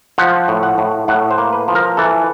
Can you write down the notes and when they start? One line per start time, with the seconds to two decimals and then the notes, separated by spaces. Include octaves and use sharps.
0.18 F3 F#5
0.48 A2
0.63 F#5
0.78 A2
1.08 A2 F#5
1.31 C5
1.38 A#3
1.53 B4
1.68 F3
1.75 A#4
1.97 E3 A4